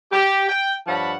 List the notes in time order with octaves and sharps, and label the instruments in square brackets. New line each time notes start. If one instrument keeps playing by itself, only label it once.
[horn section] G4
G5
G2 F3 C#5 F#5 A5 B5